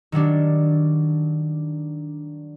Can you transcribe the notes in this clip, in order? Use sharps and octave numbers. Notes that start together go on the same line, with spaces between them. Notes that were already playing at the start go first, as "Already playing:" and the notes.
D#3 F#3 G3 D4